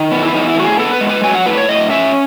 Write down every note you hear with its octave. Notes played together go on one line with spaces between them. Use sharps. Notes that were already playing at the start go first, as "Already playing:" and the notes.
Already playing: D#3
B3
E4
E3 D#4
E4
A2 F#4
G#4
B3 A4
B4
G#3
B4
F#3 G#5
F#5
A2 B4
C#5
A2 D#5
C#4 E5